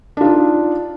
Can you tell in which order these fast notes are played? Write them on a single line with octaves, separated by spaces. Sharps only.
D4 F4 D#4